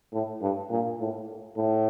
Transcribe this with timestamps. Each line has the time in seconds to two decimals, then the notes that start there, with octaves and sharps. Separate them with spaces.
0.13 A2
0.42 G2
0.70 A#2
1.00 A2
1.57 A2